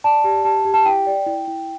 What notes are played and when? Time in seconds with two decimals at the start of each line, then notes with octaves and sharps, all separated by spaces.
0.04 D5 A5
0.24 G4
0.45 G4 A5
0.65 G4
0.74 A5
0.85 E4 G5
1.07 D5
1.26 E4
1.47 E4